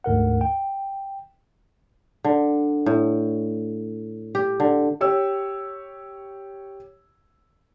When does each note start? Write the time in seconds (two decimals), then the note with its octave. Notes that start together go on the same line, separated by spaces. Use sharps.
0.04 D2 G#2 A#4 F#5
0.41 G5
2.24 D3
2.86 A2
4.35 G4
4.60 D3
5.01 G4 C#5 E6